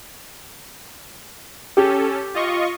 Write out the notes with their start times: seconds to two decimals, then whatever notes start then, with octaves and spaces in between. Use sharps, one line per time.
1.77 C#4 G4 A4
2.34 F4 D#5 C#6